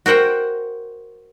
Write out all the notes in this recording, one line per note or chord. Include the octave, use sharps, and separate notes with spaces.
F#4 A#4 C5 F#5 G5